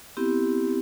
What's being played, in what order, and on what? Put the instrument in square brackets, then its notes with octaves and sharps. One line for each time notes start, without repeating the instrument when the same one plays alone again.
[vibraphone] B3 C4 E4 G4